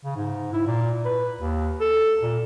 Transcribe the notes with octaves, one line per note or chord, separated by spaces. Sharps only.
C#3
G#2
E4
A#2
B4
D#2
A4
A#2